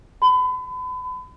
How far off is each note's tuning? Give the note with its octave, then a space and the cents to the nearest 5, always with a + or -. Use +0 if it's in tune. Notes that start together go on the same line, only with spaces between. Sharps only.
B5 +35